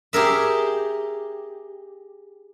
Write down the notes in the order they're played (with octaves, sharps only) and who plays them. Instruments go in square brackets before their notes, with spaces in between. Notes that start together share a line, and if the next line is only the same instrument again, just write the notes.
[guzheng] G4 G#4 A#4 E5